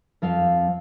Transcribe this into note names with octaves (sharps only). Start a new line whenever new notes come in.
F2 F3 C4 F5